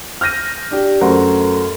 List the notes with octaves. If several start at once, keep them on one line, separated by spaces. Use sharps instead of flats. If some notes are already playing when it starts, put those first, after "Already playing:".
F6 G6 A#6 D#7
D4 G4
F#2 A3 F#4 A#4 C5